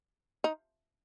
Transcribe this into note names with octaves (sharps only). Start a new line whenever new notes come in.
D#4